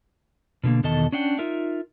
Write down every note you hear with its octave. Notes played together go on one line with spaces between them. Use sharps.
B2 D3 F3 A#3
E2 B2 D#3 A4 D#5 A5
C#4 D4 F#5 G5
D#4 F4 A#4 E5